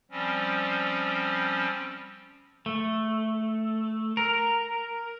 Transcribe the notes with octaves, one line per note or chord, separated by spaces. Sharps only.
F3 G3 C4 C#4
A3
A#4